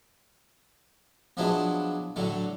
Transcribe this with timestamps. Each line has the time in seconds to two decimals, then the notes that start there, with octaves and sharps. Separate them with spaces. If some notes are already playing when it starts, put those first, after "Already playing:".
1.37 F3 F#3 G#3 B3 D4 E4
2.16 A2 D3 F#3 A3